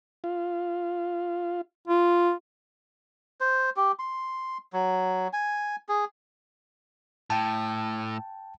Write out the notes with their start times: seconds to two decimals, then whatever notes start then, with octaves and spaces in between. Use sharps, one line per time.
0.24 F4
1.88 F4
3.41 C5
3.76 G4
3.99 C6
4.73 F#3
5.33 G#5
5.89 G#4
7.30 A2 G5 A5